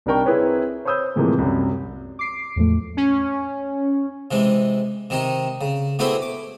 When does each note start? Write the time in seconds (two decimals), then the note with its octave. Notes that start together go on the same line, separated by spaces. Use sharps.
0.06 C2 D4 D#4 A#4 G5 C#6
0.26 C4 E4 G#4 B4 C#5
0.85 C5 C#5 B5 D#6 E6 G6
1.16 A2 C3 E3 F3 G#3 A#3
1.38 C2 F#2
2.19 D6 C7 D7
2.56 E2 A2 F3 A3
2.97 C#4
4.31 C3 E3 G#3
5.10 C3 D#3 D#4
5.61 C#3
5.99 B2 A3 C4 E4 G4 G#4
6.22 D6